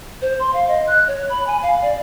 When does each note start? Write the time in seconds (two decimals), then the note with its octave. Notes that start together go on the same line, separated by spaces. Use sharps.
0.22 C5
0.39 C6
0.53 F5
0.68 D#5
0.87 F#6
1.08 C#5
1.30 B5
1.47 G#5
1.63 F5
1.82 D5